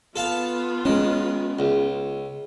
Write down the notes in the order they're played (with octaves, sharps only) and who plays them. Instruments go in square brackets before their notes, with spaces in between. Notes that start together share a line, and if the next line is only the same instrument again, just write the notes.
[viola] B3 F4 [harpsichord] A4 F5 A5
[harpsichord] D#3 [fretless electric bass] G#3 C#4
[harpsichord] C#2